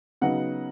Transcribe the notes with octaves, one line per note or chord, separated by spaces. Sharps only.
C#3 F#3 B3 D#4 F#5